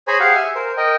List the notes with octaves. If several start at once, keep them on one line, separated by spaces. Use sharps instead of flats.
G#4 C5 C#5 G#5 A#5 B5
G4 G#4 F5 F#5
E5 G#5
A#4 C5
A#4 D#5 G5